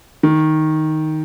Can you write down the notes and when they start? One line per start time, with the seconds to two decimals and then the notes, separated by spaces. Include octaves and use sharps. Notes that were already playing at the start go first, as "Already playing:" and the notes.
0.23 D#3